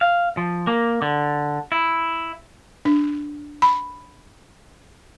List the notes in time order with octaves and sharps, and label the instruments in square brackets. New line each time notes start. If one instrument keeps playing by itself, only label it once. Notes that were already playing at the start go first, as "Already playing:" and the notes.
[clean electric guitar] F5
F3
A#3
D3
E4
[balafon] D4
B5